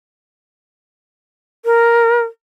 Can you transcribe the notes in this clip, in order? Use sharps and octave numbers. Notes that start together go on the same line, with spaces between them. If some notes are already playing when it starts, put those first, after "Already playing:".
A#4